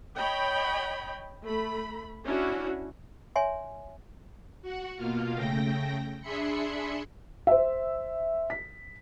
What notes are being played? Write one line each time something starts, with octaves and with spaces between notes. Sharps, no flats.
C#5 D#5 G5 B5
A3 B5
C#4 D4 E4 F#4
C#5 E5 G#5 C6
F#4 F#5
B2 A#3 F4 F5
C#3 A3 G5 A#6
D4 G#4 E5 B5 C6 C#7
C5 E5
B6